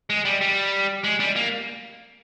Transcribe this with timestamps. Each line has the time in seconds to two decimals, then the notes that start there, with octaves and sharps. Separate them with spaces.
0.10 G#3
0.25 G3
0.41 G3
1.04 G#3
1.20 G3
1.36 A#3